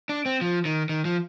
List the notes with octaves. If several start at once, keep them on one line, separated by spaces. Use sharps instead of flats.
D4
C4
F3
D#3
D#3
F3